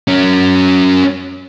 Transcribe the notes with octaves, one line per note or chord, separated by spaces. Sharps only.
F#3 C#4